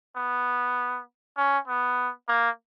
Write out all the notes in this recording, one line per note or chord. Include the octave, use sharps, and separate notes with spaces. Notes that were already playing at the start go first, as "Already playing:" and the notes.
B3
C#4
B3
A#3